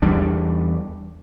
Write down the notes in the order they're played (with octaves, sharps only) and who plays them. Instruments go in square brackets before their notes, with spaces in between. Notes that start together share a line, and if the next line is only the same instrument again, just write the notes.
[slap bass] E2 G3 D4